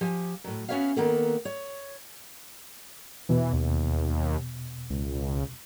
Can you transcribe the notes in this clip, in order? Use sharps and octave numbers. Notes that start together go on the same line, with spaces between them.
F3 G4 G#5
A2 F#3
B3 C#4 F#4 C#5 E5 F5
D#3 A#3 B3 A4
C#5
E2 B2 E3
D#2
C#2